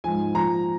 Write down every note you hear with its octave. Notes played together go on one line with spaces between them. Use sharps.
G#2 F3 G#5
A#2 F3 A#5